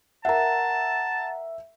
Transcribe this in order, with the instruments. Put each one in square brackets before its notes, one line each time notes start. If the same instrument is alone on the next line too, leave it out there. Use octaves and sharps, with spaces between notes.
[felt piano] A#4 E5 [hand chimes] F#5 A#5 [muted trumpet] A5